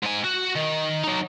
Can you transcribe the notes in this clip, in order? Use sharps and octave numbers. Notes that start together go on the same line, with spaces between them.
G#2 G#5
F#4
D#3
F#3 D#4